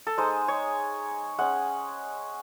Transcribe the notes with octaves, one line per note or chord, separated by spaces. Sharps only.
A4
G#3 D#4 C5
C#5
G#3 C#4 F#5